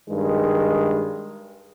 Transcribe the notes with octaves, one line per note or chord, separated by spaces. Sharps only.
G2 D#3 G#3